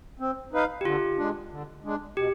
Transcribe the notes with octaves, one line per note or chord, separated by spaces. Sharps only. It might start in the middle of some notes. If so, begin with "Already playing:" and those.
C4
D#4 B4 F5
G4
D3 F4
G#3 D4
D3
G#3 D4
B2 G4